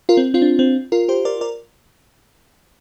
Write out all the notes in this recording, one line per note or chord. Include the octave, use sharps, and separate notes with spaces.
F4 A#4
C4
C4 F4
D4
C4
F4 A#4
G4 C5
A#4 D5
A#4 D5